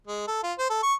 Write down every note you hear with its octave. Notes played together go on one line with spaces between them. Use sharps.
G#3
A4
F4
C5
A4
C#6